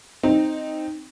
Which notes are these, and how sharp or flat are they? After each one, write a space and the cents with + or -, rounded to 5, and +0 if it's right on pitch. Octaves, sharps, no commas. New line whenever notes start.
C4 +0 D#4 +0